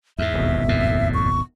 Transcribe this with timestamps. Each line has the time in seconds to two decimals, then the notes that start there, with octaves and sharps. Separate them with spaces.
0.19 E2 G#2 E5
0.34 D#1 G#1 B2
0.69 F2 A2
1.14 C#6